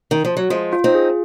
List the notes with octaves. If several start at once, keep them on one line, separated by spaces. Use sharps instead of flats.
D#3
F3
F#3
F3 G#3 F4
F4
C4 D#4
G#4